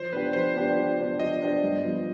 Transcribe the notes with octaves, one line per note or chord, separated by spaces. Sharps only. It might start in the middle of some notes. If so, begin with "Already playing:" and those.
Already playing: F3 C5
B3 D4 G4 B4
F3 C5
B3 D4 G4
F3
B3 D4 G4
F3 D#5
B3 D4 G4
G2
F3 B3